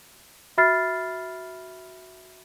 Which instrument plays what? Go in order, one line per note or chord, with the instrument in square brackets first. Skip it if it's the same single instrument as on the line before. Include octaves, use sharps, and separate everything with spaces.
[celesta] F#4 E5 B5 F6 A6 C7